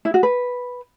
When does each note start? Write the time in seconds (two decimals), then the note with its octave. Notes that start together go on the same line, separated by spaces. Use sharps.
0.05 E4
0.14 F#4
0.23 B4